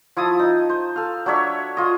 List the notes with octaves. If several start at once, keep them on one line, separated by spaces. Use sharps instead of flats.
F3 E4 A5 D#6
D#4
C5
A4 F5
F#3 D4 C#5 E5
F4 D#5